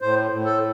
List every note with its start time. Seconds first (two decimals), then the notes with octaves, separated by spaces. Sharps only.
0.02 A2 C5
0.31 A2
0.45 A4